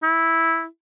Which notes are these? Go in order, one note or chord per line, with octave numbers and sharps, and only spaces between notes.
E4